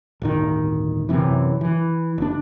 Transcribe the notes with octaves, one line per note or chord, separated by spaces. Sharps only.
D1 G1 D#3
F#2 C3 E3
E3
F#1 D4